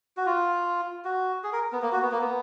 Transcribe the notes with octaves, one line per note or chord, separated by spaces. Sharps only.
F#4
F4
F#4
G#4
A#4
B3
A#3
F#4
B3
A#3
B3